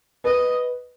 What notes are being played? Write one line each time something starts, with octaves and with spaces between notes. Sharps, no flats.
B4 D#5